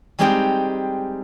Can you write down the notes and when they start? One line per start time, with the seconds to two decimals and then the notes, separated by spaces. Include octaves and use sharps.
0.19 G3 G#3 C4 D#4 G4 G5